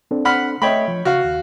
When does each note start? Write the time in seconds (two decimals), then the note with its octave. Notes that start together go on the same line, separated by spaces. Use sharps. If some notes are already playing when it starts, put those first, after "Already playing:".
0.11 C4 D4 A4
0.25 F#5 B5 F6
0.62 A3 C#5 D#5 E5 G5 B5
0.88 F3
1.05 C#3 F#4 F5 C#6
1.24 D#2